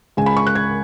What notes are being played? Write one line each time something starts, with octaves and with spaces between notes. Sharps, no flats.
C#2 C#3 G#3 G#5
B5
C#6
F#6
G#6